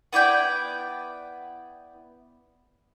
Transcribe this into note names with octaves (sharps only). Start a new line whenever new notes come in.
B3 E4 D5 G5